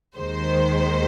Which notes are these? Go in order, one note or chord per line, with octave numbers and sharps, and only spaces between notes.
D#2 D#3 G#3 C5